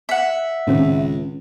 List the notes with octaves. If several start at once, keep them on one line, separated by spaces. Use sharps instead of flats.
E5 F#5
C#2 A2 D#3 C4